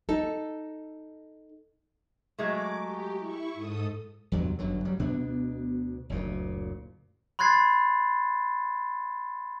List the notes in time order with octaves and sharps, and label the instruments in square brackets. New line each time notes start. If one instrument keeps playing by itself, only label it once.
[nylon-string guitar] D#4 A4
[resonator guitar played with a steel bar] F#3 G#3 A3 [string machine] D6
[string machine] G4
E4 C#6
G#2 A4 D#6
[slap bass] E2 G2 C3 F#3
G1 F#2 D3 F#3
F#3 G3
D2 B2 B3 D4
F#1 D2 A#2
[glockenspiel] B5 C6 F#6 G#6 A6 C7